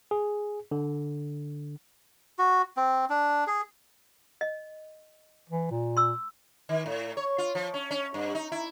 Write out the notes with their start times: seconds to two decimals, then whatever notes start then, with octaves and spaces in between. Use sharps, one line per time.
0.11 G#4
0.71 D3
2.39 F#4
2.77 C4
3.10 D4
3.47 G#4
4.41 D#5
5.50 E3
5.71 A#2
5.97 C6 E6
6.69 D#3
6.86 A2
7.17 C#5
7.38 F4
7.55 F3
7.74 C#4
7.91 C#4
8.14 G2
8.35 D#4
8.52 E4